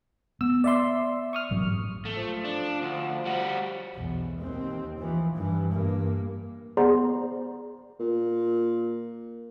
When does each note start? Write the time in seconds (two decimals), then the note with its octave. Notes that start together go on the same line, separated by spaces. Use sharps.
0.41 B3 E6
0.64 D5 E5 C6
1.33 C#6 D#6 F6
1.51 A1 G#2 F#3
2.05 A3
2.17 F3
2.44 D4
2.82 D2
3.26 G3 F#4
3.95 B1 E2
4.39 D#2 C4
4.99 E3 F3
5.34 G2 E3
5.72 G2 A#3
6.77 B3 G#4 C5 D5 A#5 C6
8.00 A#2